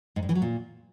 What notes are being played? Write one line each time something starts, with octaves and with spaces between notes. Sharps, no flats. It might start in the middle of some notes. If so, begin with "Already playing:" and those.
G#2
G2
E3
F#3
A#2